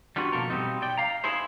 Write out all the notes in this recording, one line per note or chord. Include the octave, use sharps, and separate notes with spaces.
G3 B3 D4 F4 F#4
B2 F3 A#3 A4 A#4
B2 G3 B3 C4 D#4
D5 G5
F5 A#5
D#4 E4 G#4 C5